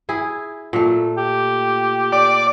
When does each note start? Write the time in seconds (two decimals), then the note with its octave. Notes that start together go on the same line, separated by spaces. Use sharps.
0.09 E4 G#4
0.73 A#2 A3
1.17 G4
2.12 D5